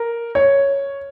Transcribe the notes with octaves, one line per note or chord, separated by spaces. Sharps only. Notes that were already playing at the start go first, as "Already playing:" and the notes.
Already playing: A#4
C#5